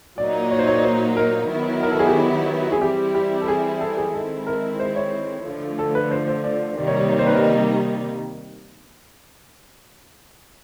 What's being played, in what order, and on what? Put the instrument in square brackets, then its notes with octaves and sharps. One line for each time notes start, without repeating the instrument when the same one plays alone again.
[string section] A#2 F#3 A#3 D#4 [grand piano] D5
[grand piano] C#5
C5
C#5
D5
C5
A#4
[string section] D#3 F#3 B3 E4
[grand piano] A#4
A4
G#4
G4
G#4
[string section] E3 G3 C4 E4 [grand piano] G4
[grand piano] G4
A4
G#4
A4
G#4
[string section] D#3 G#3 C4 E4 [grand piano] A4
[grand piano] A#4
C5
C#5
[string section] D3 F3 A3
[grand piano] A4
B4
C5
C5
D5
[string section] C3 D#3 G3 A#3 D#4 [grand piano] D5
[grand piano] C#5
D5
C#5
C5
B4
A#4